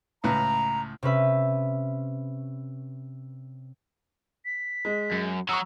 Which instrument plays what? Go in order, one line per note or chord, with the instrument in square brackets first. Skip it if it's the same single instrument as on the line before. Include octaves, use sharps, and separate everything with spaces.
[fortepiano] C#2 A2 B4 [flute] A#5
[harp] C3 C#4 B4 E5
[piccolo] B6
[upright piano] G#3
[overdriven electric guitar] F#2
[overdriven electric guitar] F#3 F#4 [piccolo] A#5 [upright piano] C#6 D#6 E6